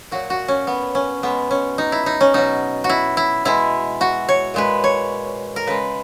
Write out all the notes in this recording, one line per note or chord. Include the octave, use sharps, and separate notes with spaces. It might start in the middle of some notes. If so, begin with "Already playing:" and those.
A#2 F#3 F#4
F#4
C#4
B3
C#4
B2 G#3 B3
C#4
D#4
E4
D#4
C#4
B2 F#3 D#4
F#4
E4
E4
B2 G#3 E4
F#4
C#5
A#2 G#3 B4
C#5
A#4
C#3 G#3 B4